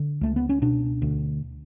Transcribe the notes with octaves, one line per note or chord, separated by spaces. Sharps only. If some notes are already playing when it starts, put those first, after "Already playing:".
Already playing: D3
C#2 A3
B3
C#4
B2 D4
D2